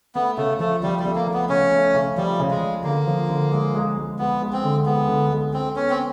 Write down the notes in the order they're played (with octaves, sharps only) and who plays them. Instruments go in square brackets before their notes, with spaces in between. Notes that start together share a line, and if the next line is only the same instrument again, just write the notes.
[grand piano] A3 [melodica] B3
[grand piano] C#3 [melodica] A3
[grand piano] F3 [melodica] A3
[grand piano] F3 [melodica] G3
[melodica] G3
[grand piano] A3
[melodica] A#3
[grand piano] A3
[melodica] B3
[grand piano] C#3 [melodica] C#4
[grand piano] A3
C#3
[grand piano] F3 [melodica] G3
[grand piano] C#3
[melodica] G#3
[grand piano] F3
[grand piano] D3 [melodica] A#3
[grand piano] F3
D3
G#3
G#3
G#3
[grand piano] G#3 [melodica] B3
[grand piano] G#3
[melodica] C4
[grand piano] D3
[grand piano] G#3 [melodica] B3
[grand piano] D3
G#3
[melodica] C4 [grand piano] A4
[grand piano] B3 [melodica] C#4
[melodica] C4